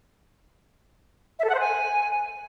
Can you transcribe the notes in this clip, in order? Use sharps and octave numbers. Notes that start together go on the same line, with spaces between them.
E5
A4
F#5
C5
G#5